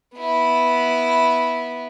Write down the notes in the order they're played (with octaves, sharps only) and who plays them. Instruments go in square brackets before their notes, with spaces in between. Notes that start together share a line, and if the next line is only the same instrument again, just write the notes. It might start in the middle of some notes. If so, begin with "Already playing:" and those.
[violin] B3 E4